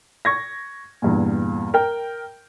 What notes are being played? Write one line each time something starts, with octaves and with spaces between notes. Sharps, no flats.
C#6 G#6 A#6
E2 G2 A#2
A#4 G5